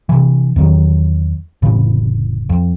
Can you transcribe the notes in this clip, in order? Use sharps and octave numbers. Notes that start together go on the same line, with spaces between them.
C3 E3
E2 D#3 F#3
F1 A2 C#3 E3
F2